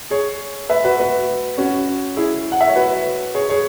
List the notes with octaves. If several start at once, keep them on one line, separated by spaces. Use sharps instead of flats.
G#4 C#5
B4 E5
F#4 B4
F#4 B4
C#4 F#4
E4 G#4
F#5
E5
C#5
F#4 B4
G#4 C#5
G#4 C#5